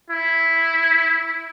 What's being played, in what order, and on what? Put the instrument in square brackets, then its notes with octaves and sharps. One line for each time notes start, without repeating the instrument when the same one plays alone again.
[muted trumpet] E4